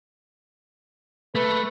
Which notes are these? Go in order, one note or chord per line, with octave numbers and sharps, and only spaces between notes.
A3 B4